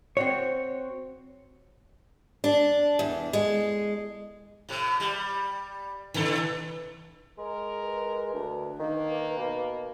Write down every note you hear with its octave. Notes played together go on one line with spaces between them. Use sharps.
C4 F#4 C#5
D4
E2
G#3
A2 C3
G3
B2 D3 E3 A4
G#3 A#4
B4
D2 B4
D#3 A#3
B2